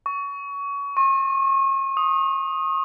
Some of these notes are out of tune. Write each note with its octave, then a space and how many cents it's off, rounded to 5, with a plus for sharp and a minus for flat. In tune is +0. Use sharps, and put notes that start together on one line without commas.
C#6 +25
C#6 -40
D#6 +0